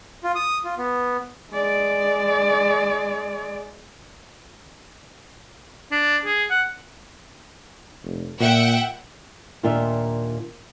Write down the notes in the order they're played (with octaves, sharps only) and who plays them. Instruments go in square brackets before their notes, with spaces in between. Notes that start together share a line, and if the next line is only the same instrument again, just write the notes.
[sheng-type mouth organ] F4
D#6
F4
B3
[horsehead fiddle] G#3 D5
[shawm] D4
G#4
F#5
[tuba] F1
[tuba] A#2 [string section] E5 F#5 G5
[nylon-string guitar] D#2 A#2 D4 F4 E5